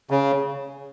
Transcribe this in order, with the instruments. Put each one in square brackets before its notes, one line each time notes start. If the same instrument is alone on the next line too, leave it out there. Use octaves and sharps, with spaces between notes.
[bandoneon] C#3